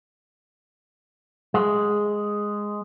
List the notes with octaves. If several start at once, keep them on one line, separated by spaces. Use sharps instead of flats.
G#3